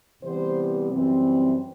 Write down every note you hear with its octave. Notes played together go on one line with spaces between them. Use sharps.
E2 C3 E3 G3 B3 C5
F#2 E3 G3 C4